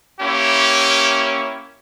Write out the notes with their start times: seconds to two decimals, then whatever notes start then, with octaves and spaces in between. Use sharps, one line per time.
0.20 A#3 C#4 E4 G4